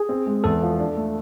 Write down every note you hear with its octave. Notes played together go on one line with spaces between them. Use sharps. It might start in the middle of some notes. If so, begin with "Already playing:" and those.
Already playing: G#4
C4
G#3
E2 A4
F3
D4
A3